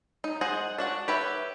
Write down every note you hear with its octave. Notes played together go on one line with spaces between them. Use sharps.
D#4
G#4 C5 D#5 F#5
D4 F#4 F#5
G4 B4 C#5 E5